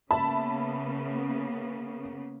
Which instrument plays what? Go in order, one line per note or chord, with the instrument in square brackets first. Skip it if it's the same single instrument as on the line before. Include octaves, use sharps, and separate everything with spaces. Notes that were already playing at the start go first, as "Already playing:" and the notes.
[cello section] C#3 A#3 B3 [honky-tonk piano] E5 A5 B5